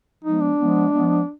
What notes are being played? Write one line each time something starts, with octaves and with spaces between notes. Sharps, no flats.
F3 G#3 B3 D#4
D4
F3 G#3 B3
F3 G#3 B3